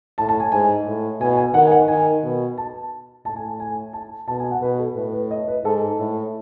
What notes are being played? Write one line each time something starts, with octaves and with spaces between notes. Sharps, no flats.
A2 A5
A5
G#5
G#2 G#5
A2
B2 G#5
G#5
D#3 F#5
G#5
F#5
D#3 G#5
B2
A5
A2 A5
G#5
G#5
A5
B2 A5
G#5
F#5
B2 B4
A4
A2 B4
B4
D#5
B4
G#2 A4
A2